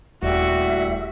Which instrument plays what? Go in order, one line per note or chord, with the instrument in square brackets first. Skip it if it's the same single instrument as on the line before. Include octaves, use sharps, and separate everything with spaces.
[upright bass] D#1 [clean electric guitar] A2 G3 G4 [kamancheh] F#4 [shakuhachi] E5